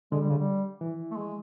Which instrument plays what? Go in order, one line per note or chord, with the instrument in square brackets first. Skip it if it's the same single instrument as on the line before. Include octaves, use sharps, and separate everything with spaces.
[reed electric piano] D3 [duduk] G#3
[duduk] G3
C#3
G3
[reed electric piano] E3
[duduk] A3
G#3